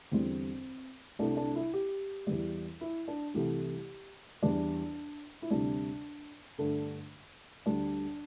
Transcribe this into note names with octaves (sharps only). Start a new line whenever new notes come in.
E2 D3 G3 C4
C2 C3 A3 D4
D4
E4
G4
E2 E3 G3
E4
D4
C2 C3 E3 A3 G4
E2 E3 G3 D4
E4
D2 C3 G3 D4
G2 D3 A3
D2 D3 G3 D4